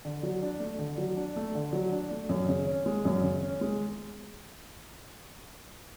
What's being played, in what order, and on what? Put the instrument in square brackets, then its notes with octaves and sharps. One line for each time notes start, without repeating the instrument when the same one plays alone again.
[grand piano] D3
F#3
D4
A3
D3
F#3
D4
A3
D3
F#3
D4
A3
F#2
C#3
C#4
G#3
F#2
C#3
C#4
G#3